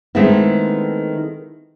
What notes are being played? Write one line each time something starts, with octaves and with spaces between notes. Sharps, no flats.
D#3 G#3 A3 B3 C4 E4